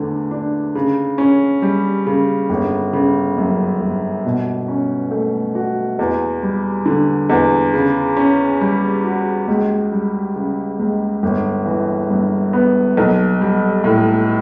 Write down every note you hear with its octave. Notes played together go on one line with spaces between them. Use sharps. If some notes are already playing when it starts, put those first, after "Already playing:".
Already playing: E2 D3 A3
D4
C#3
C#4
G3
C#3
G1
C#3
F#2
G1
B2
C#4
A3
F#4
E2
G3
D3
E2
C#3
C#4
G3
F#4
C#2
G3
C#3
C#2
G1
E3
G2
B3
B1
G3
A2